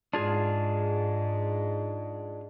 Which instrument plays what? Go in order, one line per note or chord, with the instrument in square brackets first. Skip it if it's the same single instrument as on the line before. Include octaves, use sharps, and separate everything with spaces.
[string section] G#2 [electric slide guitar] D4 F4 G#4